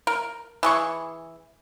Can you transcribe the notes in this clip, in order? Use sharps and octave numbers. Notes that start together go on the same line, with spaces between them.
A#4
E3 G#4 C#6